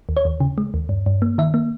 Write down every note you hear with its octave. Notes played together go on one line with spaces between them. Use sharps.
D#2
C#5
D#2
C#3
G#3
D#2
G2
G2
A#3
D#3 E5
A#3